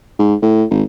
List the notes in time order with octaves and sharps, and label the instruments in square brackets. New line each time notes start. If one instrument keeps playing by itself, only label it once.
[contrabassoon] G#2
A2
G#1